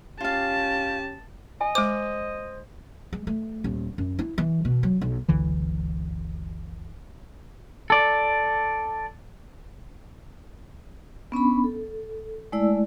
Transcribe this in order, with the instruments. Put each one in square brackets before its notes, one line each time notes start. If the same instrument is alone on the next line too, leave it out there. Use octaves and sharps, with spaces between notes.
[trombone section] C#4 G4 [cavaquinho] F4 F5 [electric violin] A5
[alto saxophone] D#5 [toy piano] G#5
[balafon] G#3 D6 [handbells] C5
[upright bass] G#3
A3
D#1
F#2
E4
E3
B2
F#3
B1
[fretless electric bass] F#1 C#2 D3 E3
[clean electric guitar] A4 D5
[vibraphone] B3 C#4 D4 B5
A4
G#3 A3 E4 D5 E6